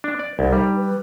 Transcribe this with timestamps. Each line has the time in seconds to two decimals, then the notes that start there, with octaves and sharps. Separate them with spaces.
0.04 D4
0.19 D5
0.39 C2 D#4
0.53 G3
0.76 B4